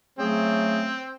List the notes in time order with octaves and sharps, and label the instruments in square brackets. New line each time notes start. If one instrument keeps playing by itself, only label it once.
[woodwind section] C#3 F#3 A3 [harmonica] C4 [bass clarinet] G#4